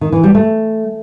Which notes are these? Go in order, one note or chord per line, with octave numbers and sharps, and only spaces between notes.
D#3
E3
G3
A3